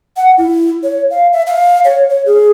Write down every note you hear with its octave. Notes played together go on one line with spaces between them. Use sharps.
F#5
E4
C#5
F5
E5
F5
C#5
C#5
G#4